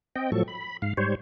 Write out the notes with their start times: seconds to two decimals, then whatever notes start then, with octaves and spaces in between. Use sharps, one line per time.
0.16 C4 D#5 G5
0.32 A2 F3 F#3 A4 C#6
0.48 B5
0.82 G#2 F5
0.97 G#2 G3 C5 C#5